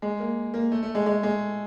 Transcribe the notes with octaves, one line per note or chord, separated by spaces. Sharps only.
G#3
A#3
A#3
A3
A3
G#3
G#3
G#3